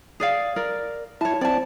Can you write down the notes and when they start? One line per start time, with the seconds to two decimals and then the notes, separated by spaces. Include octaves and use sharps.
0.20 G#4 D5 F5
0.56 A#4 D5
1.21 E4 C#5 A5
1.41 C4 D5 A5